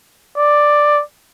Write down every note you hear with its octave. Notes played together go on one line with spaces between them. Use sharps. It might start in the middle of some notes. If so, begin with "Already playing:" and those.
D5